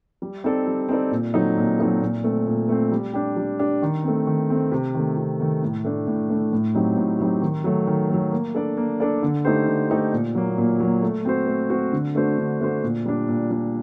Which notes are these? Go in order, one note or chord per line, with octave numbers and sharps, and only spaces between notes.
G3
C4 D#4 A4 D5
G3
C4 D#4 A4 D5
A#2
F#3 C4 D#4 A4
A#2
F#3 C4 D#4 A4
A#2
A3 C4
A#2
A3 C4
G3
D4 G4
G3
D4 G4
D#3
A3 C4
D#3
A3 C4
C3
D#3 A3
C3
D#3 A3
A2
A3 D4
A2
A3 D4
A2
F#3 C4 D#4 G4
A2
F#3 C4 D#4 G4
D#3
F#3 A3
D#3
F#3 A3
A#3
D4 A4 D5
A#3
D4 A4 D5
D3
A3 D#4 G4 C5
D3
A3 D#4 G4 C5
A#2
F#3 A#3
A#2
F#3 A#3
A3
C4 F#4 C5
A3
C4 F#4 C5
D3
A3 D4 F#4 C5
D3
A3 D4 F#4 C5
A#2
G3 D4
A#2
G3 D4